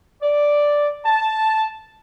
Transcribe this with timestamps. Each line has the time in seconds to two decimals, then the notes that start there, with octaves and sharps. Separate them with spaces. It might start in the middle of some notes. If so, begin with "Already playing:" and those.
0.23 D5
1.06 A5